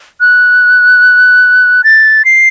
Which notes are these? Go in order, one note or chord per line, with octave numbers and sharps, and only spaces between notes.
F#6
A6
C7